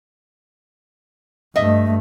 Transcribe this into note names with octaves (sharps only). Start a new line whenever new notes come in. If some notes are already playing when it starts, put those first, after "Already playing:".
G2 A3 D#5 E5